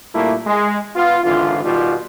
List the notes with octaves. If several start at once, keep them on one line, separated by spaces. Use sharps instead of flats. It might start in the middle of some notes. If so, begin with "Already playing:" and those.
A#2 G3 A3 A#3 D4 E4
G#3
B3 F4
G#1 D3 E3 F4
B2 D#3 G3 F4